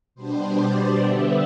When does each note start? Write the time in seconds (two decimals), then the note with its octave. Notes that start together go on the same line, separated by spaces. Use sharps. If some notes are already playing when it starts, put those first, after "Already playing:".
0.15 B2 G3 B3 D4 C5
0.58 D5
1.02 D3 G3 B3 D4 E5